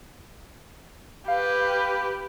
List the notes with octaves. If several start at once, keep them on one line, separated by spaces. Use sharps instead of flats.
G4 B4 F5